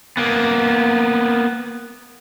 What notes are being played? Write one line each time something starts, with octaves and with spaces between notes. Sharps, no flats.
A#3 B3